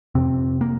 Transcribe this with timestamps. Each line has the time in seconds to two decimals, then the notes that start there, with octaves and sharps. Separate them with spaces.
0.15 F2 C3 C4
0.61 A#3